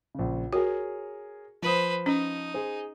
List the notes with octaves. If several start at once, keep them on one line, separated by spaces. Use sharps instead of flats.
A#1 C#3
F#4 G#4 A#4 C#5
F3 B4 C5 D#6
C#4 D#4
G#4 C5